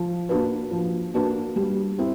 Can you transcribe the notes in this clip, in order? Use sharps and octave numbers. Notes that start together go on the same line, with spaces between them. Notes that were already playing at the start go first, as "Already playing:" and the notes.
Already playing: F3
A#3 D4 F#4 B4
F3
A#3 D4 F#4 B4
G3
C4 E4